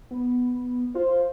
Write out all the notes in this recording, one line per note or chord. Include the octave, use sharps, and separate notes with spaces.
B3
F4 C5